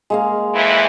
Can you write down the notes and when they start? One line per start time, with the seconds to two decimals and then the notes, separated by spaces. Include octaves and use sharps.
0.10 G#3 A#3 F5
0.54 F2 E3 E4